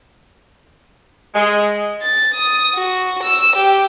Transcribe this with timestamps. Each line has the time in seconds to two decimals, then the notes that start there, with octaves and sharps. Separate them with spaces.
1.35 G#3
2.02 A6
2.34 D#6
2.75 F#4
3.23 E6
3.56 G4